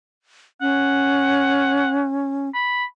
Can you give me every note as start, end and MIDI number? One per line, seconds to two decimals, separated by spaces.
0.61 2.49 61
0.61 2.04 78
2.54 2.84 83